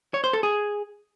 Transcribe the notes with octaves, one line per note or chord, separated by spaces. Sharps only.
C#5
C5
A4
G#4